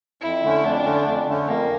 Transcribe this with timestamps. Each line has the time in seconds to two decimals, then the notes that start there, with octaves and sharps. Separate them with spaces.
0.22 F2 E4
0.43 D3 A3 C#4
0.64 F2 D4
0.84 D3 A3 C#4
1.06 F2
1.27 D3 A3 C#4
1.47 F2 A#3